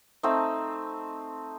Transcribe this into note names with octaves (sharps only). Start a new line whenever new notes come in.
A3 C4 D#4